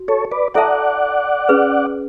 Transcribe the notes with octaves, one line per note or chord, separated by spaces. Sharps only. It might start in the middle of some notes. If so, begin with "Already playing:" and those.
Already playing: F#4
A4 C#5
B4 D5
E4 A4 D5 E5 F#5 A5
C#4 G#4 B4